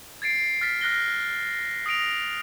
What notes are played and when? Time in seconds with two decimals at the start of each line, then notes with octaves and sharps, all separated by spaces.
0.22 G#6 A6 C7 D7
0.61 F6 A6 B6
0.81 F6 F#6 A#6 G7
1.86 D#6 A#6 D7 F7